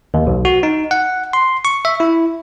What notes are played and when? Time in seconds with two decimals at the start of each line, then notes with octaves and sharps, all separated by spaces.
0.14 D#2
0.27 B1
0.45 F#4
0.63 D#4
0.91 F#5
1.33 C6
1.65 C#6
1.85 E5
2.00 E4